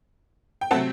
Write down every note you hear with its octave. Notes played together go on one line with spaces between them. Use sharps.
G5
C3 F#3 A3 C4 F#5 A5